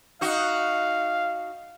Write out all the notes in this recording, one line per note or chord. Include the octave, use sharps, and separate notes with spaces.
D#4 F#4 F5